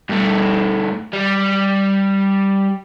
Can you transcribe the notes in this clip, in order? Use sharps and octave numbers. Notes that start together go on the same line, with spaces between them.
G2 A3
G3